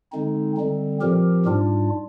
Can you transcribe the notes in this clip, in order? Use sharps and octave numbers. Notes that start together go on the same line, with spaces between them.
D3 G#3 C4 D#4
D3 G3 C4
A#2 F3 C4 G4 A#4
G#2 G3 D4 F4